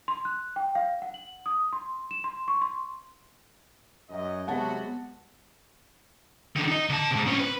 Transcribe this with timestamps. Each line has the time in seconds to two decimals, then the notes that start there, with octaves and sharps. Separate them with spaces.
0.08 C6
0.25 F#6
0.56 G5
0.75 F5
1.02 F#5
1.14 F#7
1.46 D#6
1.73 C6
2.11 E7
2.24 C6
2.48 C#6
2.61 C6
4.10 F#2 D#5
4.48 C3 F#3 G#3 B3 F#4 F#5 A5
6.56 D#3 D4
6.68 D#4 D#5
6.89 D3 A5
7.11 G#2 C3
7.26 C4 C#4
7.40 B4